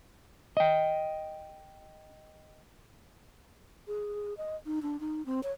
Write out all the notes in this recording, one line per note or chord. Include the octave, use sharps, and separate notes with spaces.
D#5 G5
G#4
D#5
D#4
D4
D#4
C4
C#5